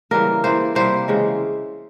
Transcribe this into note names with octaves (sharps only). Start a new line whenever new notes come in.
C#3 E3 G3 A#3 A#4
E3 A#3 C5
C3 G3 A#3 C5
C#3 E3 G#3